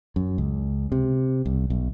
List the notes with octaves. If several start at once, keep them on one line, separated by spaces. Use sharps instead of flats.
F#2
C#2
C3
C2
B1